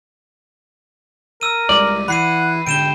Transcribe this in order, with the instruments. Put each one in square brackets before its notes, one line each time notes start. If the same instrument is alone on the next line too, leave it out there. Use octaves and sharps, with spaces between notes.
[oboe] A#4 [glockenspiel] E6 D#7
[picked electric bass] C#2 G3 G#3 [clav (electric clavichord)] D5
[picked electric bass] E3 [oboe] F#5 [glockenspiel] B5 C7 D#7
[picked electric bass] G#2 D3 [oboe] G5 [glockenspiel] D7 E7 G7